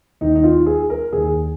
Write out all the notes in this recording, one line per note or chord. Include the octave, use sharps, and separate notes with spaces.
D#2 D#3 D#4
D#4
F4
G#4
A#4
D#2 D#3 G#4